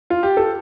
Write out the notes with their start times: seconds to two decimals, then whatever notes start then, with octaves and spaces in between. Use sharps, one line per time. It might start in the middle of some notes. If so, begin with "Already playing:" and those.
0.10 F4
0.23 G4
0.37 A4